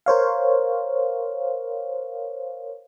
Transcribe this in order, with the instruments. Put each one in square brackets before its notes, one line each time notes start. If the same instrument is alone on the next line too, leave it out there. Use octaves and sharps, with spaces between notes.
[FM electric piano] A#4 C5 C#5 F5